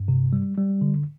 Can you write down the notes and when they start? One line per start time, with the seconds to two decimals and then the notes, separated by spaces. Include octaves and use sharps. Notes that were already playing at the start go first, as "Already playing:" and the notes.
Already playing: G2
0.08 C3
0.33 G3
0.57 G3
0.81 D3